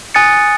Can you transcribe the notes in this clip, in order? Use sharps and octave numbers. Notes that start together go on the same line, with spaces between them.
G#5 D#6 F#6 A6 C#7